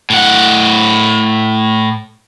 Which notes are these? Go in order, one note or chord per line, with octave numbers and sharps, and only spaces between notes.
A2 F#5